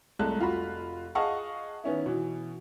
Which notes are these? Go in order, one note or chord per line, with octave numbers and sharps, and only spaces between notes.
C2 G#3 A3 A5 F#6
F1 F4 F#4 B5
G#4 D#5 F5 F#5 A5 C#6
D#3 B3 C#4 E4
B2 E3